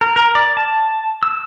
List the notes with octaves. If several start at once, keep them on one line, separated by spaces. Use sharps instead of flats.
A#4
A#4
D5
A5
E6